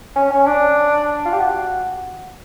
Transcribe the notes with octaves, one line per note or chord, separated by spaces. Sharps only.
C#4
C#4
D4
F4
G4
F#4